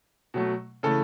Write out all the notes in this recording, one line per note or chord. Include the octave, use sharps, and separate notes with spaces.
B2 F#3 A3
C#3 E3 A3 A4